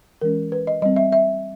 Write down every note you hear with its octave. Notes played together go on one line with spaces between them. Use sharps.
E3 G#3 C#4 A#4
B4
D#5
G3 C4 D#5
E5
E5